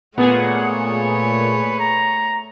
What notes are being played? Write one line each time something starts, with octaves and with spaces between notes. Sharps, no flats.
A#2 A3 B3 G#4 C#5 F#5
B4
A#5